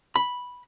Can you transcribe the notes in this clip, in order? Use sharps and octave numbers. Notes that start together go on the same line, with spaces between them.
B5